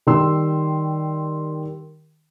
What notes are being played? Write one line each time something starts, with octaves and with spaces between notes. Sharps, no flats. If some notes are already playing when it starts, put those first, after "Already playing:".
D#3 G3 C6 E6